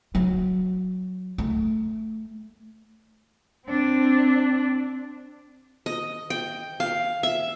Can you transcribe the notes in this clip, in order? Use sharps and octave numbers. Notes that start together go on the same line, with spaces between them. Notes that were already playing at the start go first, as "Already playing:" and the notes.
F#3
A3
C4 D4
D#5
G5
F5
E5